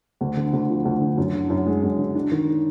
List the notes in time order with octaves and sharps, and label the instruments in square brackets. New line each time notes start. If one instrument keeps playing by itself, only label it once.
[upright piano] D2
D3
D2
F3
D2
D3
F#2
D3
F#2
G#3
F#2
D3
D4
D#3